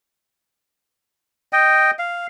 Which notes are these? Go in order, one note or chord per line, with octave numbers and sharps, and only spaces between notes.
D#5 G5
F5